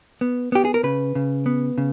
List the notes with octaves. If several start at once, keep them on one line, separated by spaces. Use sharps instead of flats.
B3
B3 G4
G#4
A#4
C#3 B4
C#3
B3
C#3